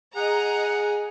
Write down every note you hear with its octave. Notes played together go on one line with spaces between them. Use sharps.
G#4 D#5 F#5 A#5